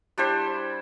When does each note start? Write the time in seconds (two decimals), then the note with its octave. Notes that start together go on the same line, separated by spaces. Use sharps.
0.18 G3 D4 E4 C5